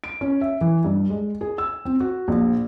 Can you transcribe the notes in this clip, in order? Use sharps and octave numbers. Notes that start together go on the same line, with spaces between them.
D7
C#4
E5
E3
G2
G#3
G#4
E6
C4
F#4
A#1